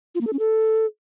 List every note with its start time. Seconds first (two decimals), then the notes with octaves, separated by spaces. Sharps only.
0.15 F4
0.21 A#3
0.27 A4
0.33 C#4
0.39 A4